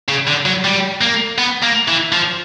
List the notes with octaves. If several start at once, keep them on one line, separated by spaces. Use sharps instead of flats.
C#3
D3
F#3
G3
A#3
B3
A#3
E3
F3